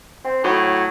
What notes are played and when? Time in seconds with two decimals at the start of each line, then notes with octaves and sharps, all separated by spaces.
0.24 C4
0.44 A2 F#3